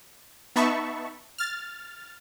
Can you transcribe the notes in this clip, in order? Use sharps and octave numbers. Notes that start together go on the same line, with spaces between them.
B3 D#4 E5 A5 B5 C#6
F6 A6